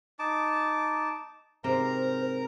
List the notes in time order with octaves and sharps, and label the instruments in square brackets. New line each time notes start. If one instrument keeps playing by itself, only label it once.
[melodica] D#4 A5 D6
[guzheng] G#2 C3 C4 [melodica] A#4 A#5 [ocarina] C5